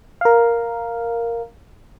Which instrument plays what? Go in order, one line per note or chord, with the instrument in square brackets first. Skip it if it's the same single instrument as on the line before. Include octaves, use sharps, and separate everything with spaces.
[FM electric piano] A#4 F5